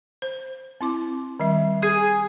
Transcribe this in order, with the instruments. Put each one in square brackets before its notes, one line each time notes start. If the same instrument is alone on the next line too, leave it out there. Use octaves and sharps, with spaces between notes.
[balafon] C5
C4 E4 D6
D#3 G3 E5
[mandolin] G#4